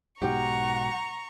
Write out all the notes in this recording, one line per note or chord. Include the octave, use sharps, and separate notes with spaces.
B1 G#2 B2 G4 F#5 A#5 C#6